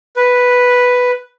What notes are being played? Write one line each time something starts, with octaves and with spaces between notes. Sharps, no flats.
B4